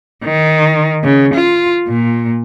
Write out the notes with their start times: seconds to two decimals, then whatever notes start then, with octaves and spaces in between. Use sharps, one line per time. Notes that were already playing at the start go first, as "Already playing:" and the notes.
0.24 D#3
1.04 C#3
1.34 F4
1.88 A#2